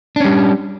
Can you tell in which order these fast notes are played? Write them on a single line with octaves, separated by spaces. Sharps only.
D4 C#4 G3